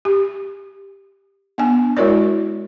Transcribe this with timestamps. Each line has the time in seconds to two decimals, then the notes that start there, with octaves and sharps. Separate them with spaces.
0.05 G4
1.58 B3 D4 G#5
1.97 G#3 E4 F#4 A#4 C#5 D5